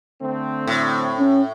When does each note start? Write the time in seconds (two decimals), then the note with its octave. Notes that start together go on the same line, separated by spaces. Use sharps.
0.21 D3 A3 C4
0.67 A2
1.19 C#4